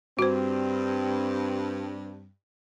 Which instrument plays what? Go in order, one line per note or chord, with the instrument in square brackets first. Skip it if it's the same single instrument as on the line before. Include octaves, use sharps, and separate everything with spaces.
[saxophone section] G2 [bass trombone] C4 [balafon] F#4 C5